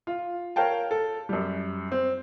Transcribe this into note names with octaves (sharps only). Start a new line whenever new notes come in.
F4
A#4 C#5 F5 G5 A5
A4
F#2 G3
C4